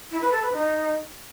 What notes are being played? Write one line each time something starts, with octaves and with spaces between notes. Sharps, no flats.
E4
B4
A4
B4
D#4